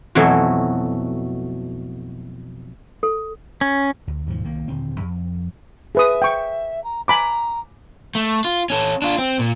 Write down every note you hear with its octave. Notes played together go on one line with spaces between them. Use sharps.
F2 B2 E3 F#3 A3 G#5
A4
C#4
D2
D#2 G#2 B2 F3
C2 D#3 A#3
D#1 D3 C4
F2
G#4 B4 E5 D#6
G5 C#6
A#5
G#5 A#5 B5 D6
A3
F4
C#4 A4
D4 F4
C4
A#2